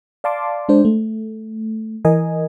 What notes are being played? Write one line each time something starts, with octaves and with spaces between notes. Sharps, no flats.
D5 F5 A5 C6 D6
G#3 D4 C5
A3
E3 A#4 D#5 G#5